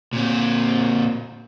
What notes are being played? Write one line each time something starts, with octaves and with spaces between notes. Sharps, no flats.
A#2 C4